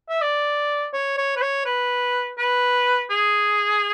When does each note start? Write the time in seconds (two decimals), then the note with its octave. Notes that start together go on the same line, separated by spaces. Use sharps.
0.09 E5
0.21 D5
0.93 C#5
1.17 C#5
1.37 B4
1.42 C#5
1.65 B4
2.38 B4
3.10 G#4